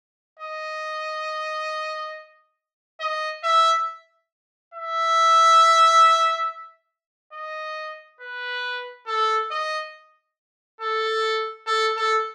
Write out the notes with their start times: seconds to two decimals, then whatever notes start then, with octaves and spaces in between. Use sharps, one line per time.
0.40 D#5
3.00 D#5
3.44 E5
4.74 E5
7.33 D#5
8.21 B4
9.07 A4
9.51 D#5
10.81 A4
11.67 A4
11.97 A4